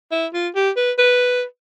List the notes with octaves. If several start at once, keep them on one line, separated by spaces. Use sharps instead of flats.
E4
F4
G4
B4
B4